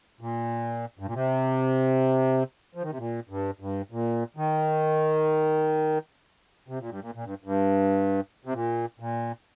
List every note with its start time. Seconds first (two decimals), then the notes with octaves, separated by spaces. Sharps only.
0.21 A#2
0.99 G2
1.07 A#2
1.14 C3
2.75 F3
2.83 D#3
2.90 C3
2.98 A#2
3.29 G2
3.60 G2
3.91 A#2
4.37 D#3
6.68 C3
6.79 A#2
6.89 G2
7.01 A#2
7.15 A#2
7.25 G2
7.44 G2
8.45 C3
8.53 A#2
9.00 A#2